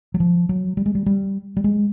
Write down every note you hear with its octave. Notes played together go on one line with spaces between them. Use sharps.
F#3
F3
F#3
G3
G#3
G3
G3
G3
G#3